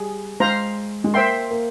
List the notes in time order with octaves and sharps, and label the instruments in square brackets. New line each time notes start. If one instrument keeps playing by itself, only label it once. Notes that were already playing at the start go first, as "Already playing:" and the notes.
Already playing: [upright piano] G3 [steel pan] G#4
[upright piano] G#3 [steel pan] C5 F5 A#5
[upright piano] G#3
[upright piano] A#3 [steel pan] C5 E5 G5 C6
[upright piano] A#3